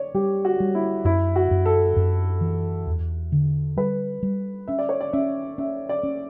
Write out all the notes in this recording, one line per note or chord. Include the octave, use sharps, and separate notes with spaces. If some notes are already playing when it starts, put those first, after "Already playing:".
Already playing: C#5 D5
G3 G4
F#4
G3
E4
F#2 E4
F#4
F#2
A4
F#2
E3
E2
D3
G3 B4
G3
C#4 E5
D5
C#5
D5
C#4 E5
C#4 E5
D5
C#4